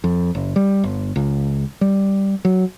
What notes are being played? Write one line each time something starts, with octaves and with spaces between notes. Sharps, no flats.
F2
F#1
G3
G1
C#2
G3
F#3